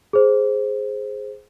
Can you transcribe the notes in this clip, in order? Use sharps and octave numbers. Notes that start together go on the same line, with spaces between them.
G#4 C5